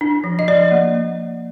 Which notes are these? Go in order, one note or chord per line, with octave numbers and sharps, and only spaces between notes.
D4
F3
D#5
F3 D5
A#3